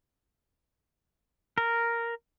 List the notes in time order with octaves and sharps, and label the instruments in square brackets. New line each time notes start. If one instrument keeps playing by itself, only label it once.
[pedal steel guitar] A#4